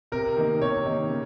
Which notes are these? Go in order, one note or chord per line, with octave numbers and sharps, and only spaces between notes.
C3 A#4
D#3 A#3 D#4
C3 C#5
D#3 A#3 D#4
C#3